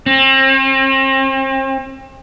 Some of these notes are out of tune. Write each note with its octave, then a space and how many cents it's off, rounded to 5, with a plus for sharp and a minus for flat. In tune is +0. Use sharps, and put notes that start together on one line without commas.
C4 +40